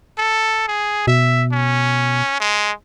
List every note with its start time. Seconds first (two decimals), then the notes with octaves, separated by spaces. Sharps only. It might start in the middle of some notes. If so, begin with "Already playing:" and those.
0.18 A4
0.68 G#4
1.07 B2 E5
1.52 C#4
2.40 G#3